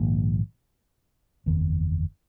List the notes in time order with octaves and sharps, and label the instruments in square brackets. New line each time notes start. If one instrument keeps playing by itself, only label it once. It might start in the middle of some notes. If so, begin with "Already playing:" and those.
Already playing: [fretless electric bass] A#1 G#2 D#3 A#3
F#1 E2 D#3